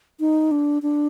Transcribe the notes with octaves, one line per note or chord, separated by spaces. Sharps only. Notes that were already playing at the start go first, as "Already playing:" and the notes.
D#4
D4
D4